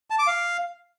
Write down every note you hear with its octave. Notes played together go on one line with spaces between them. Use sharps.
A5
D6
F5